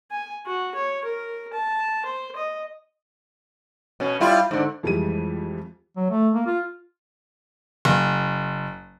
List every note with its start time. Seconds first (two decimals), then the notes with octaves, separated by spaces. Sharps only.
0.11 G#5
0.47 F#4
0.75 C#5
1.05 A#4
1.53 A5
2.05 C5
2.36 D#5
4.00 B2 C#4
4.20 G3 E4 F4
4.51 G#2 D3
4.83 F2 E3 G3 G#3 D#7
5.97 F#3
6.10 A3
6.34 A#3
6.47 F4
7.85 F#1